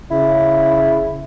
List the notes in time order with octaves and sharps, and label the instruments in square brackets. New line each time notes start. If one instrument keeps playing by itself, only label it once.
[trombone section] C#3 [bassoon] E4